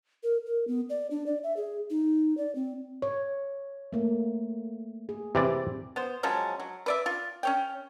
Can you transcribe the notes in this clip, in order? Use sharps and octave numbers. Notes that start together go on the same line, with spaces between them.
A#4
A#4
B3
D5
D4
D5
E5
G#4
D#4
D5
C4
C#5
A3 A#3
G#4
C3 E3 C4 G4 D5
B3 C5
F3 F#3 G#3 C#4
F#3
B4 D5 E5
F4
C#4 C#5 G5